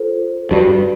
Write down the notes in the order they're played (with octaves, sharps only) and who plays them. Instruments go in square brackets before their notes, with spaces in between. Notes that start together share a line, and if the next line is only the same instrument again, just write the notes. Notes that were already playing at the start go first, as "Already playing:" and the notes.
Already playing: [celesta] F4 A4 C5
[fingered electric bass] G2 [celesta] F#4 B4 D5